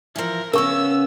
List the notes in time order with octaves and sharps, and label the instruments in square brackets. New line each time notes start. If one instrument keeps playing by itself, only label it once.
[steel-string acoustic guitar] E3 F3 [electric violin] A#4
[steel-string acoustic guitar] C#3 B3 C#4 [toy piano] A#4 C#6 [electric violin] E6